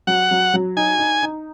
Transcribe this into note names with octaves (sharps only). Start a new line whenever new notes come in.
F#3 F#5
F#3
F#3
D#4 G#5
D#4
D#4